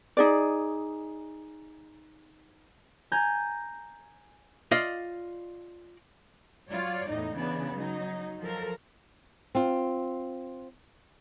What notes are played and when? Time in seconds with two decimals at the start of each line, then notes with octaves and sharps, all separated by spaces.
0.17 D#4 G#4 D5
3.12 G#5 A#5 G6 G#6 A#6
4.71 F4 D5 D#5 F5
6.68 F#3 F4 C#5 D5
7.07 E2 A2 D#4
7.37 C#3 E3 B3 D4
7.72 F#3 D#4
8.40 F3 F#3 A4 A#4
9.55 C4 F4